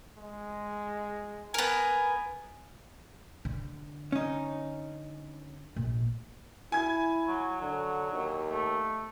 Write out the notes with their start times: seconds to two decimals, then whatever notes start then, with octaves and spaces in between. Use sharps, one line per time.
0.18 G#3
1.54 B3 A#4 G#5
3.45 D3
4.12 C#4 D#4
5.76 A#1
6.72 E4 G#5 G#6
7.27 F#3
7.61 D3 F#3
8.12 D#2
8.50 A3